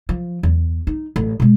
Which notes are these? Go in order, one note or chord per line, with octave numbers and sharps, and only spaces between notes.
F3
E2
D#4
A1
B2 G#3